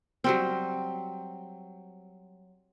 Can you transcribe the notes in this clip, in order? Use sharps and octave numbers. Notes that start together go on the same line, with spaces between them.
F#3 G3 C4